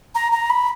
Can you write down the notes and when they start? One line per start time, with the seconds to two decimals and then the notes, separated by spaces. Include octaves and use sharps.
0.15 A#5
0.32 A#5
0.50 B5